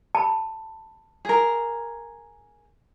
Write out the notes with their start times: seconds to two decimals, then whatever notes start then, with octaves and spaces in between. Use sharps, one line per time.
0.15 A5 B5
1.25 G#4 A#4